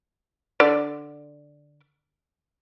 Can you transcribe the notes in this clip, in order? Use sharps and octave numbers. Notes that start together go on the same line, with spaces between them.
D3 D5